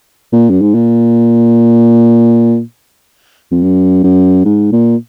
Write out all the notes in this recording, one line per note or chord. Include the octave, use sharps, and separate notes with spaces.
A#2
F#2
G#2
A#2
F2
F#2
F#2
G#2
A#2